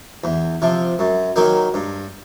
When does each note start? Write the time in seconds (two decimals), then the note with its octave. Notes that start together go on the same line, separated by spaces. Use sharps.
0.24 E2
0.62 C3 F3
0.99 F#2
1.36 D#3 F#3 A#3 D#4
1.74 G2